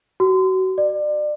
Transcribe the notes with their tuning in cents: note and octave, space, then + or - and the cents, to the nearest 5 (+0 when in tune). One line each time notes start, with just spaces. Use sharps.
F#4 +30
D5 +30